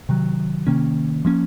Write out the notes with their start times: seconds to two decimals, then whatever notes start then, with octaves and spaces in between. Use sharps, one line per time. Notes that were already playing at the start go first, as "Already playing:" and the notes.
0.09 C3 D#3 F#3
0.67 C3 D#3 A#3 C#4
1.25 F3 A#3 C#4